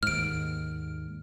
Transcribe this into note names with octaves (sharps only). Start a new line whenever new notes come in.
D#2 G#2 F6 D7